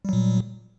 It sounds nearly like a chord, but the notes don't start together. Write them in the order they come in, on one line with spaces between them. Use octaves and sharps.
G3 F#3 A#2